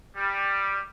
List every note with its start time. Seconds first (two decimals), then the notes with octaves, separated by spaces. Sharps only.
0.16 G3